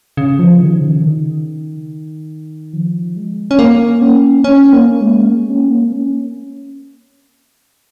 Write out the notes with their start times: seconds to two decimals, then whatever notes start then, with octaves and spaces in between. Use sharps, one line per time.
0.17 C#3
0.39 F3
0.61 D#3
0.81 C#3
1.03 D#3
2.73 F3
3.16 G#3
3.51 C#4
3.59 A#3
4.02 C#4
4.44 C#4
4.73 A#3
5.01 G#3
5.28 A#3
5.50 C#4
5.71 A#3
5.92 C#4